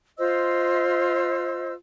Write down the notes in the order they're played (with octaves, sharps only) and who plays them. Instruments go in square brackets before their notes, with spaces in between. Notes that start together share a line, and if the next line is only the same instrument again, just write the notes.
[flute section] F4 C5 D#5 E6